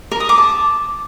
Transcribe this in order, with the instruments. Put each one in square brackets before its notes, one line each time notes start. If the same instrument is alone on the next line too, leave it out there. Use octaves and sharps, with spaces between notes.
[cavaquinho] A#4
D#6
D6
A5